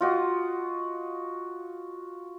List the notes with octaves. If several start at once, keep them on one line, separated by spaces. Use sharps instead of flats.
F4 F#4 D#5